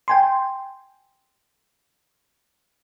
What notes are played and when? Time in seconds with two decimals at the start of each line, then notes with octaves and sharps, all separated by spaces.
0.08 G5 G#5 C6